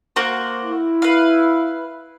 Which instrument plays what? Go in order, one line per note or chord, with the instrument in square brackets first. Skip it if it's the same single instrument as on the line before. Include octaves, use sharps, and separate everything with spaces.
[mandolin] A#3 F#4 C5
[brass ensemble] E4
[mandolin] B4 F5